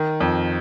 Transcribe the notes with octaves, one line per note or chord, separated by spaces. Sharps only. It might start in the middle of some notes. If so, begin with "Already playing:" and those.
Already playing: D#3
F2